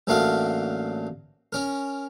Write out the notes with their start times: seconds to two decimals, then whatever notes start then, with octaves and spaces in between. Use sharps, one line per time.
0.07 A1 F#3 A3 A#3 D4 F5
1.53 C#4 A#4